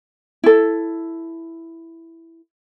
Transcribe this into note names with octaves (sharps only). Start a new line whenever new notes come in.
E4 A4